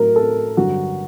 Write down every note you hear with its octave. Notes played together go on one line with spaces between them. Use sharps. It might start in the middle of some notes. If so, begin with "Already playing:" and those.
Already playing: A2 F#3 A#4
A4
G2 D3 F#3 F#4